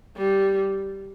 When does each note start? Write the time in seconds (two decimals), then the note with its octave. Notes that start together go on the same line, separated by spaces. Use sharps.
0.17 G3